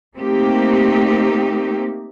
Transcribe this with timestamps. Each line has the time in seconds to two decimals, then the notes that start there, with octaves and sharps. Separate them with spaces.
0.17 A3 A#3 C4 D#4 G4